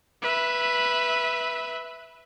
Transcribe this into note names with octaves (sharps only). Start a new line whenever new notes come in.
B4 E5